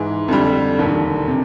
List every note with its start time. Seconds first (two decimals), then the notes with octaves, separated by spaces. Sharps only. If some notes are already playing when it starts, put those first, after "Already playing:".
Already playing: G#2 E3 G#3
0.28 F2 D3 G3
0.79 E1 D#2 D3
1.28 C3